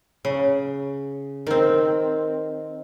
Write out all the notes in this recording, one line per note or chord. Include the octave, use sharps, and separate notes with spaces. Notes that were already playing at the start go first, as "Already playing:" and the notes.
C#3
D#3 C4